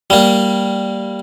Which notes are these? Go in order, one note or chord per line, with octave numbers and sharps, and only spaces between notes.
G3 A#3